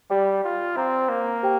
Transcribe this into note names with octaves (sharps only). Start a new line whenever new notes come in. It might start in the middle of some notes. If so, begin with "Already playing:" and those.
G3 G4 D5 G5 D6
F4
C4 C5 A#5 D6
A#3
G4 C5 G5